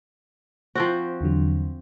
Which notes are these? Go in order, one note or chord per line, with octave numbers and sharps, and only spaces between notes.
F3 C4 F#4 C5
E2 D3 F#3